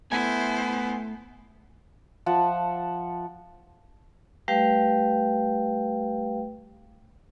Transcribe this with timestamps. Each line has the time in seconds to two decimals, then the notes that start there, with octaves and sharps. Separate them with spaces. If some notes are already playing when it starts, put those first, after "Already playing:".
0.12 A3 B3 E4 C5 G#5
2.26 F3 E5 F#5 A5
4.48 G3 A3 G4 B4 F5 G5